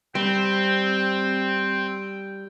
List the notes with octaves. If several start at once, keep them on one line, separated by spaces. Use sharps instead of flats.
G3 C4 G5